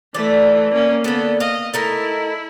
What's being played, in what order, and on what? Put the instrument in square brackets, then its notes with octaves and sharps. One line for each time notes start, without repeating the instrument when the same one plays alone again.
[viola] E3 A3 [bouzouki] D5
[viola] A#3 C#4
[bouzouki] D3 A4 [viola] A#3 B3
[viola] D#5 [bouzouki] F5
[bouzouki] A3 D#4 A#4 [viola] E4